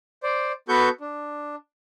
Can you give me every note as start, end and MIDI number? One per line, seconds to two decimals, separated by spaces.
0.23 0.52 72
0.23 0.52 74
0.69 0.89 59
0.69 0.89 66
0.69 0.89 69
0.69 0.89 71
0.69 0.89 85
0.69 0.89 91
1.01 1.56 62